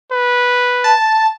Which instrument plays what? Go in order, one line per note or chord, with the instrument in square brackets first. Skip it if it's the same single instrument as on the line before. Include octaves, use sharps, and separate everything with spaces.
[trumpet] B4
[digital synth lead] A5